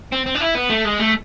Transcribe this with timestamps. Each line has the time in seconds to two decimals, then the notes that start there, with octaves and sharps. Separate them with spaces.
0.12 C4
0.26 C4
0.35 D4
0.41 E4
0.55 B3
0.70 A3
0.85 G#3
0.99 A3